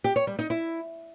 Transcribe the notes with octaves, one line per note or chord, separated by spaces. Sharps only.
G4
C#5
G3
D#4
E4